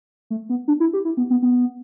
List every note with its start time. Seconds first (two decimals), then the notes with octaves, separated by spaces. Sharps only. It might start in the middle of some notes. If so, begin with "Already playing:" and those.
0.30 A3
0.49 B3
0.68 D4
0.80 E4
0.93 G4
1.05 E4
1.17 B3
1.30 B3
1.42 B3